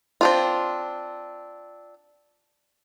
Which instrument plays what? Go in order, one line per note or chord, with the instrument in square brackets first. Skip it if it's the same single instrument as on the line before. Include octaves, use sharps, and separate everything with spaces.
[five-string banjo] C4 D4 F4